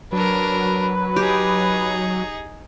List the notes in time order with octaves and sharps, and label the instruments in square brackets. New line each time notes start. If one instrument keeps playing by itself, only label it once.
[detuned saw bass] F#3 [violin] D4 A#4 [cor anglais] B4
[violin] D#4 G#4 [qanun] G4